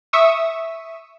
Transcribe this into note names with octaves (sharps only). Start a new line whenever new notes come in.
E5 C#6 D#6 E6